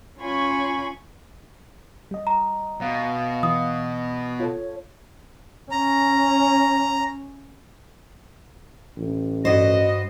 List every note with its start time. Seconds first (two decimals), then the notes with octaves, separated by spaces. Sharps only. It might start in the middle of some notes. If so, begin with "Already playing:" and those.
0.19 C#4 F4 C#5 G#5 B5 C#6
2.11 G3 D#5
2.27 A#5
2.81 B2 F5
3.43 E3 D#6
4.40 F4 A4 C#5
5.71 C#4 A#5
8.97 A1
9.45 G2 F#4 C5 D#5